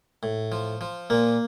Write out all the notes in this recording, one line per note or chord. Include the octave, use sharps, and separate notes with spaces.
A2
F3
F3
A#2 A#3